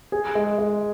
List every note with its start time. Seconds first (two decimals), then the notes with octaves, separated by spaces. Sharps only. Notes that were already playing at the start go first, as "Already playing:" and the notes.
0.12 G#4
0.35 G#3
0.58 G#3